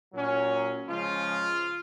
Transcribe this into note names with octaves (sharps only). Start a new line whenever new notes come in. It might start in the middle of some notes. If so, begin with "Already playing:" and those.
A#2 F#3 C#4
C#3 F3 G#3 F4